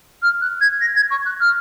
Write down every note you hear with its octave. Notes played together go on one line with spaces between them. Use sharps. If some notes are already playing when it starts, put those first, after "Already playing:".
F6
F#6
G#6
A#6
G#6
C#6
F#6
F6